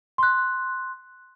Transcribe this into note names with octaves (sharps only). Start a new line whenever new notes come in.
C6 F#6